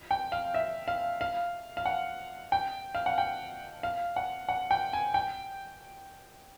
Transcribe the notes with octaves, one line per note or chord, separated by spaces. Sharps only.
G5
F5
E5
F5
F5
F5
F#5
G5
F5
F#5
G5
F5
F#5
F#5
G5
G#5
G5